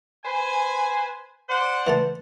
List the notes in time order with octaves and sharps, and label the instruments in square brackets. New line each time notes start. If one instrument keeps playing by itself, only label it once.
[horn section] B4 C5 G#5
C5 D5 F#5
[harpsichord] E3 A3 A5